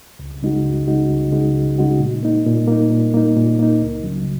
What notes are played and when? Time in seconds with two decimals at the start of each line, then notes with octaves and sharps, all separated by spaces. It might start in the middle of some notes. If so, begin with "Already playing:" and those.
0.19 C#2
0.43 C#3 G#3 D#4 F#4
0.65 C#2
0.87 C#3 G#3 D#4 F#4
1.10 C#2
1.32 C#3 G#3 D#4 F#4
1.55 C#2
1.78 C#3 G#3 D#4 F#4
2.00 A#2
2.23 A#3 D#4
2.46 A#2
2.68 A#3 D#4
2.91 A#2
3.14 A#3 D#4
3.36 A#2
3.59 A#3 D#4
3.82 C#2
4.03 C#3 F#3